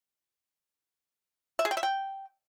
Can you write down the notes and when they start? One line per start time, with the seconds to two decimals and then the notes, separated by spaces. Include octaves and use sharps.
1.59 E5
1.65 G#4
1.71 G5
1.77 E5
1.83 G5